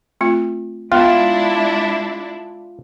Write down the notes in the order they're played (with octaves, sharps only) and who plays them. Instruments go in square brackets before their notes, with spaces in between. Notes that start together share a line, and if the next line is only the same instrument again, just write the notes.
[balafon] A3 C4 F4
[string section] G#3 D4 E4 [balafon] B3 [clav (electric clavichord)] F4